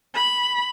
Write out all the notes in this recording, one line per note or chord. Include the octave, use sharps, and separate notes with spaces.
B5